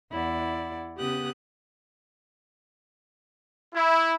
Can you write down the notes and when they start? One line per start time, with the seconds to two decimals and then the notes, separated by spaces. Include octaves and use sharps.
0.11 E2 E4 D5 F#5
0.98 C#3 B3 G4 D#6 F#6
3.74 E4